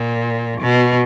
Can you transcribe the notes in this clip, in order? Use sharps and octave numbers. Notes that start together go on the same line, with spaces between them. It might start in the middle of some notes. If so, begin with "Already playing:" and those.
Already playing: A#2
B2